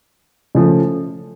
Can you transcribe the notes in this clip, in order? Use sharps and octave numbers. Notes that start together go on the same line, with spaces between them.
C#3 F3 A3